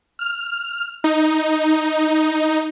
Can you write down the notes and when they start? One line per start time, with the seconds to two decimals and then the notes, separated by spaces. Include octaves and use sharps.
0.19 F6
1.04 D#4